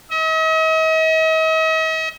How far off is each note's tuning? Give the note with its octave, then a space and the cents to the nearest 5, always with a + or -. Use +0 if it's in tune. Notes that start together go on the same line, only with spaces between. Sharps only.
D#5 +45